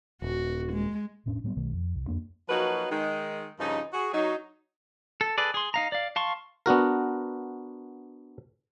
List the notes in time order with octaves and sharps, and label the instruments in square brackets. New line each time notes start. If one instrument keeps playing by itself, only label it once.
[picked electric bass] D#1 [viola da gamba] F#4
[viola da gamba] G#3
[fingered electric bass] E1 A2 C#4 D4
A2 F#3 G3 B3
B1 B2 D#3 A3
F2
C2
F2 G#2 A#3 D4
[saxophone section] F3 F#3 A#3 D#4 F#4 B4
D#3 G#3 D#4
G2 C#3 F3 D#4
F#4 G#4
F#3 D#4
[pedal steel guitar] A4
G#4 A4 B4 D5
G#4 C6
D#4 F5 A#5
D5 F5
F5 A5 C6 C#6
[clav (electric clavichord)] B3 D4 F#4 A#4